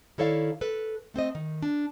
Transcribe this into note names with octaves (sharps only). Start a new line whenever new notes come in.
D#3 E4 A4 C#5 D5 F5
A4 B4
A3 C4 C5 D#5
D#3
D4